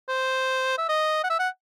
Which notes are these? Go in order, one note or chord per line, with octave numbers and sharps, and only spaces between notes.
C5
E5
D#5
F#5
E5
F#5